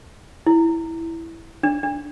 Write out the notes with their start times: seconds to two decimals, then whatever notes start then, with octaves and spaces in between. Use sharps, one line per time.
0.46 E4
1.63 D4
1.83 D4